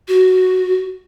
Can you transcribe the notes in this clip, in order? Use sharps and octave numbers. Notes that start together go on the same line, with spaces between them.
F#4